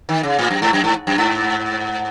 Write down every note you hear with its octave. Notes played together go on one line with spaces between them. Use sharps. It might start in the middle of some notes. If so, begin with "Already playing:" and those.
D#3
C#3
A2
F#2
G#2
F#2
G#2
F#2
G#2